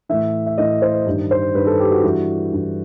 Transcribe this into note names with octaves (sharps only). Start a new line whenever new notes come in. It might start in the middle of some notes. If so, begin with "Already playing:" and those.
A2 E3 E5
E5
A2 E3 D#5
C5
G2 D#3
C5
G2 D#3 B4
A4
G4
F#4
G2 E3
G2 E3